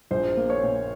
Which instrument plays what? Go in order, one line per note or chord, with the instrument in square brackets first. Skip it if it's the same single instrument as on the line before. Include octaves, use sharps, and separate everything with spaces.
[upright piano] A#1 C5
A#3
C#5
A#2